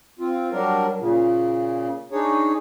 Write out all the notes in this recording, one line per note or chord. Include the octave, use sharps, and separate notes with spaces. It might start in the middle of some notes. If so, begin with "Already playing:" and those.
C4 F4
F#3 G3 D4 A#4
A#2 C#3
D4 D#4 G#4 C#5